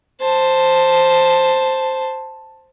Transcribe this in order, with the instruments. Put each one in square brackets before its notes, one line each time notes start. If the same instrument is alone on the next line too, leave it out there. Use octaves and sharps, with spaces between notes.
[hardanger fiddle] C5 A5